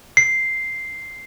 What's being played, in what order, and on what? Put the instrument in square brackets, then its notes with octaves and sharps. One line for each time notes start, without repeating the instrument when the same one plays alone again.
[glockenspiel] C7